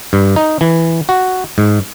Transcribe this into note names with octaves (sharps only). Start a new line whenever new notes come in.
G2
D#4
E3
F#4
G#2